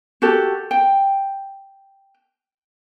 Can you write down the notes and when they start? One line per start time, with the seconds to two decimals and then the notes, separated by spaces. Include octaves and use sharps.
0.22 F#4 G4 A4
0.71 G5